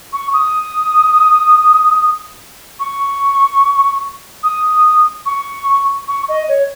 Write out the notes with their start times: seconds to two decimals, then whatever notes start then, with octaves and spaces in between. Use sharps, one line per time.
0.13 C#6
0.33 D#6
2.80 C#6
4.43 D#6
5.26 C#6
6.08 C#6
6.28 D#5
6.49 C#5